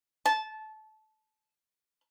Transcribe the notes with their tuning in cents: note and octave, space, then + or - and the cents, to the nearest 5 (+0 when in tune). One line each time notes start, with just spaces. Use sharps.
A5 -20